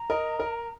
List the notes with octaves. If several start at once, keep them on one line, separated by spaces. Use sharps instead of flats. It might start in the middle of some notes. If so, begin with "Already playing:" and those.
Already playing: A#5
A#4 D#5
A#4